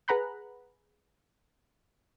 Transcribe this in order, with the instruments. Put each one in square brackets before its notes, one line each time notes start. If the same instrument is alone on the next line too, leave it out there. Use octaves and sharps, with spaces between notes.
[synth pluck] G#4 B4 F#5 A#5 B5 F#6